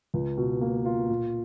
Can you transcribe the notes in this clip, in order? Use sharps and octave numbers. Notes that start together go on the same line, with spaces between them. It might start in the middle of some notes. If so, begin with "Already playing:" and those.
C#2
B2
A#3
F4
A#2